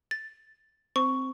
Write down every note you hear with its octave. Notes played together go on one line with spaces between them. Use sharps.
A6
C4 C#6